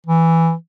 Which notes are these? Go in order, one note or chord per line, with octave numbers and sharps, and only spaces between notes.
E3